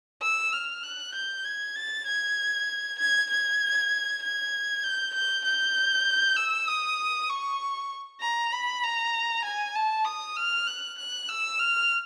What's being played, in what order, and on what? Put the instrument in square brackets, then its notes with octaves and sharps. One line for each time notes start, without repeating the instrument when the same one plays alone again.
[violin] E6
F6
F#6
G6
G#6
A6
G#6
G#6
G#6
G#6
G6
G6
G6
E6
D#6
C#6
A#5
B5
A#5
G#5
A5
D#6
F6
F#6
F#6
E6
F6